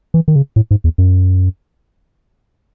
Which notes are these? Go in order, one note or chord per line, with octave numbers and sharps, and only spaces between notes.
E3
D#3
C#3
A2
G#2
E2
F#2